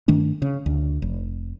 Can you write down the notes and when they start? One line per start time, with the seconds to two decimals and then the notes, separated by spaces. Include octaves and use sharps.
0.08 G2 D#3 A3 D4
0.42 C#3
0.66 D2
1.02 F1